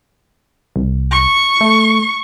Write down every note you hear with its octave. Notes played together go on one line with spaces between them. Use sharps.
C2
C#6
A3